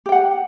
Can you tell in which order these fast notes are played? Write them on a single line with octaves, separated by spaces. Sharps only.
G4 G5 F#5